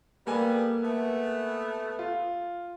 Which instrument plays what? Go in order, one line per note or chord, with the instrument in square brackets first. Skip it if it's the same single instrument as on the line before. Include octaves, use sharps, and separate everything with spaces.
[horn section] G3 B3 [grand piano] A#3 A4 G#5
[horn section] A3 B3
[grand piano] F4